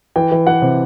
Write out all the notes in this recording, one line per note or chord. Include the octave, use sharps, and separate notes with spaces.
E3 G5
E3
E3 F#5
C3